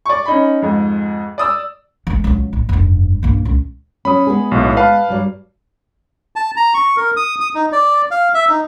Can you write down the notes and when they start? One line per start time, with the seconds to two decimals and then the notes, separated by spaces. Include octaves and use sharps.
0.06 D5 C#6
0.26 C#4 D#4 B5
0.62 F2 G#2
1.38 D5 D#6 E6
2.07 E3 G#3
2.24 C#2 F#3
2.53 A2
2.69 F1 G2
3.23 G2 A#3
3.45 C#2 C#4
4.05 F#3 C#4 B5 D#6
4.27 G#3 B3 G#4
4.51 B1 A2
4.77 B4 F5 A5
5.09 G2 F#3 G3
6.36 A5
6.57 A#5
6.74 C#6
6.97 A#4
7.17 D#6
7.40 D#6
7.55 D#4
7.72 D5
8.11 F5
8.34 E5
8.49 D#4